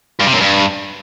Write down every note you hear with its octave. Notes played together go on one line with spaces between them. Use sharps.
G2
C3
F#2
G2